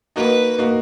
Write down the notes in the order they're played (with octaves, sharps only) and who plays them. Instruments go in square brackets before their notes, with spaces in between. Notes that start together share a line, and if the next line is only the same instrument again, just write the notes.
[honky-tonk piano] A#3 D#4 F#4 [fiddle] B4
[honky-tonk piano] A#3 D#4 F#4